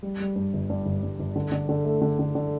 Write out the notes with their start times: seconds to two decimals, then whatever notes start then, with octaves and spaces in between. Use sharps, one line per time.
0.03 G3
0.20 G3
0.36 G2
0.53 G1
0.70 G2
0.85 G1
1.03 G2
1.19 G1
1.36 D3
1.52 D3
1.69 D3
1.85 A3
2.01 D3
2.19 D3
2.35 D3